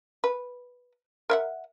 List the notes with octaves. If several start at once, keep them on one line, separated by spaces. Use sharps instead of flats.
B4
A#4 E5 F#5